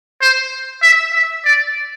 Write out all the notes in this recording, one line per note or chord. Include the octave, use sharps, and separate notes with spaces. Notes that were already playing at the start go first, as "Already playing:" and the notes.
C5
E5
E5
D5